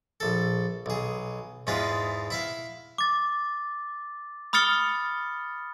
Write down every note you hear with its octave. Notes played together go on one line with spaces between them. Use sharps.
A#1 A4
B1 G#4
E2 G#2 G#3 F4 B4
E4 E5 F5
D6 A6
B5 D#6 F6 A6 C#7 G7